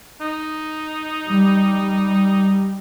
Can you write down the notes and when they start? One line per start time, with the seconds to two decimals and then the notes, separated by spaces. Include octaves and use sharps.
0.21 D#4
1.29 G3